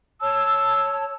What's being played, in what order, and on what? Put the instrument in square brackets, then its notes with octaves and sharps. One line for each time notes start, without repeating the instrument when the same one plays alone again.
[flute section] C#5 A5 [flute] E6